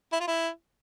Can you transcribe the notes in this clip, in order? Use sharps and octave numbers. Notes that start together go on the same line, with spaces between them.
E4
F4
E4